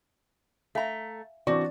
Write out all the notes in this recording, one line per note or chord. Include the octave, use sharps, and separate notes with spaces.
A3 E5 F5 G#5 A#5
E3 C4 D4 F#4 D5 C#6 D6